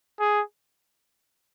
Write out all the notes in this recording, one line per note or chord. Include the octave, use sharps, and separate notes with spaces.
G#4